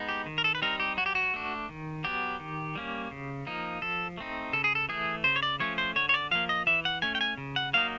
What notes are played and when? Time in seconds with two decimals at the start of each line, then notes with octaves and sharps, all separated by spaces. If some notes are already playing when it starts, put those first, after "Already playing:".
Already playing: G#3 B3 D#4
0.09 G4
0.26 D#3
0.38 A#4
0.44 A4
0.55 B4
0.62 G3 C4 D#4 A#4
0.80 G4
0.97 F#3 F#4
1.06 G4
1.15 F#4
1.34 A3 D4
1.69 D#3
2.04 F#3 B3 G4
2.40 D#3
2.75 G3 A#3 C#4
3.11 C#3
3.47 F3 A#3 D#4
3.82 F3 A4
4.18 A3 C4 D#4
4.53 C#3 A4
4.64 G#4
4.75 A4
4.89 E3 A3 G#4
5.24 C#3 C5
5.36 C#5
5.43 D5
5.60 F3 A3 C#4 C#5
5.78 C5
5.96 D3 C#5
6.09 C#5
6.14 D5
6.31 F3 A#3 F5
6.49 D#5
6.67 E3 E5
6.85 F#5
7.02 A3 C#4 G#5
7.15 G5
7.21 G#5
7.37 C#3
7.56 F#5
7.73 F#3 A#3 D#4 F5